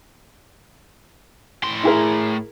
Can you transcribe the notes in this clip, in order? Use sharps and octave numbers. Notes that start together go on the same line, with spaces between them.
A2 C6
E4 G#4 A#4